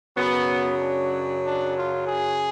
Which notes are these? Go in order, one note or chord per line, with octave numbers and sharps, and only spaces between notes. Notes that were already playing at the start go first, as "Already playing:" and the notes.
F#2 C#3 F#3 B3
D4
D4
F4
G#4